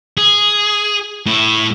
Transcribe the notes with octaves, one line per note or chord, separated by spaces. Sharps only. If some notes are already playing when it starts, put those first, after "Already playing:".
G#4
A2 E4